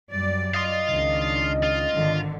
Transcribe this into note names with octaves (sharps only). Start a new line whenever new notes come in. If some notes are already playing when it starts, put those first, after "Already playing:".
F#2 G3 D5
D#5 F5 C6
C#2 D#3 D4
F4
G#1 D3 D#3